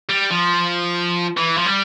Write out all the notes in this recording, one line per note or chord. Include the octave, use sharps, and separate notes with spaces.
G3
F3
E3
F3
G3